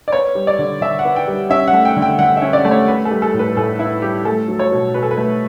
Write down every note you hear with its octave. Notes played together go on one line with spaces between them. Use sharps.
D5
B3 C#5
G3
D5
D3
D3 E5
F#5
B3
G5
G3
C#4 E5
F#5
A3
G5
D3
G5
D3 F#5
C#4 E5
D5
A3
C#5
B3 B4
A4
G3
A4
A2
B4
A2 A4
B3 E4
G3 G4
A3 A4
F#3
C#5
B2
B2 B4
A4
B4
A3